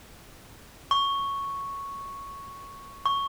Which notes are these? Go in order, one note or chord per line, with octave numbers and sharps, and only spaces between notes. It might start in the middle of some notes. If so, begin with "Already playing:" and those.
C#6
C#6